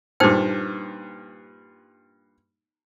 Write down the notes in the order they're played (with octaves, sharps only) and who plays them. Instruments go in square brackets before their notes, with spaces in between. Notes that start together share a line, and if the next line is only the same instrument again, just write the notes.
[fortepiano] G2 A#2 [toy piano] D#4 C5 G5